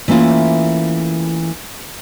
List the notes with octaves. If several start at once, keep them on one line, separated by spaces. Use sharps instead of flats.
E3 A3 A#3 C#4 F4